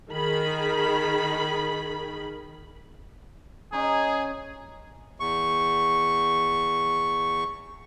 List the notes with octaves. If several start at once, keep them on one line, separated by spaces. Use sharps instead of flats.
D#3 G#4 B5
C#4 D#4 G#4
E2 C#6